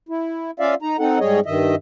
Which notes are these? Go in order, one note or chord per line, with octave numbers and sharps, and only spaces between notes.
E4
C#4 F4 D5 E5 F5
D#4 A#5
C4 D#4 A4 F#5
G#2 G3 G#4 C#5 D#5
G2 D#3 D#5 E5